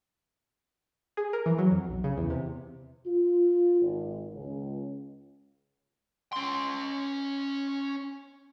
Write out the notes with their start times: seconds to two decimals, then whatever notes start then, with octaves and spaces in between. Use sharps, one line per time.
1.17 G#4
1.33 A#4
1.46 E3
1.58 F#3
1.70 F2
1.88 B1
2.04 C#3
2.18 E2
2.30 C3
3.06 F4
3.81 G#1
4.33 C#2
6.33 C#4 C6